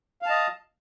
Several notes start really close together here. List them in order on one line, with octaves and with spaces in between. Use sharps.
F5 A5 D#5